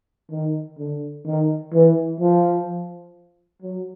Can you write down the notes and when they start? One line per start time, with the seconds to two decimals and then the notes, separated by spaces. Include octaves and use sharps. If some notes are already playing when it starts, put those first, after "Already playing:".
0.32 D#3
0.78 D3
1.26 D#3
1.74 E3
2.20 F3
3.62 F#3